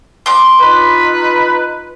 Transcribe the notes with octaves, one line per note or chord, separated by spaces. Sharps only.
C6 D6
D#4 F4 B4